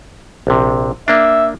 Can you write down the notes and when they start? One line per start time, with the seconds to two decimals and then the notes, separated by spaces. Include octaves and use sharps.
0.47 A#1 C3
1.08 A#3 D4 E5